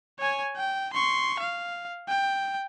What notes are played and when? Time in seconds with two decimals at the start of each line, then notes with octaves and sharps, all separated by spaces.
0.19 C#5 G#5
0.57 G5
0.94 C6 C#6
1.40 F5
2.08 G5